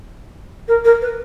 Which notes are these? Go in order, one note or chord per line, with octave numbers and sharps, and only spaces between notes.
A#4
A#4
B4